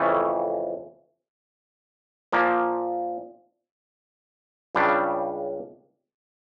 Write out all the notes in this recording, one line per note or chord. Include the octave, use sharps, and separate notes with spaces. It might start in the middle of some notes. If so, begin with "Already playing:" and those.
Already playing: F2 C#3 E3 A3
A#2 F3 A#3
C#2 C#3 G3 D4